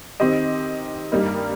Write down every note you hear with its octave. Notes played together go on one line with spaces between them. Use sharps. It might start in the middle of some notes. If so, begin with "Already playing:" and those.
D#3 C4 G4 D#5
G2 G3 A#3 D#4